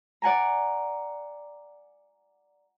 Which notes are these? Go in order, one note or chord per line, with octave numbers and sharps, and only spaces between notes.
D5 F#5 G#5 A#5